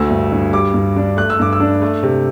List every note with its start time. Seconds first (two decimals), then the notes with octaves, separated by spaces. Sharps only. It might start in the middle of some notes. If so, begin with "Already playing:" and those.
Already playing: D2 A3 E6
0.10 G2
0.32 G2
0.53 G3 D6
0.74 G2
0.96 D4
1.17 A3 F#6
1.30 E6
1.39 G2 D6
1.53 E6
1.60 D4
1.82 A3
2.03 C3